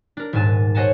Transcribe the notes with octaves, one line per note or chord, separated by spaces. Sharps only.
D4 A#4
D#1 G#2 G#5 A5 A6
C5 C#5 D#5 F#5 G#5 A5